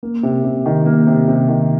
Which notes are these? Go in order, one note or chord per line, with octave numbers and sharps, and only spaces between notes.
A#3
C3
C3
D#3
A#3
C3
C3
D#3